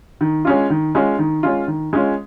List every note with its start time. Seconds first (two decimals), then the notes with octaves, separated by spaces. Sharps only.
0.21 D#3
0.45 G#3 C#4 F4
0.70 D#3
0.95 G#3 C#4 F4
1.19 D#3
1.43 G#3 C#4 F4
1.68 D#3
1.93 G#3 C#4 F4